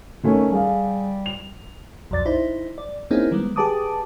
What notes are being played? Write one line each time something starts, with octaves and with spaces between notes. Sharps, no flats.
D#3 A3 C#4
G3 G#4 F5
F7
B1 F2 D5 A6
D#4 E4 C5
D5
A#3 C4 C#4 D#4 E4 G#4
D#3 G3 G#3 B3
G4 G#4 B4 A5 D6 D#6